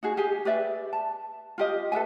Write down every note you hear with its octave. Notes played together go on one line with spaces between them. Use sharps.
D#4 F#4 G#4
G4 G#4 G#5
G4 B4 D5 E5
A5
F4 G4 D#5
A4 B4 E5 G#5